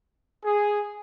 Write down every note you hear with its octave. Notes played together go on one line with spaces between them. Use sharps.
G#4